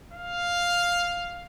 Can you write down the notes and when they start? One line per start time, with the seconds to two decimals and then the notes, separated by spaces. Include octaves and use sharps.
0.13 F5